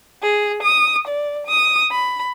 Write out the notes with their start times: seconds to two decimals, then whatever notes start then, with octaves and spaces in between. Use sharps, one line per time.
0.22 G#4
0.62 D#6
1.08 D5
1.47 D#6
1.91 B5